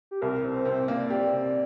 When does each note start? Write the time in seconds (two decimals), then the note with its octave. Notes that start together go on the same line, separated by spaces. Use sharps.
0.11 G4
0.22 C2 A#4
0.44 C3
0.54 C5
0.65 C3
0.88 A#3 D5
1.10 G4
1.33 C3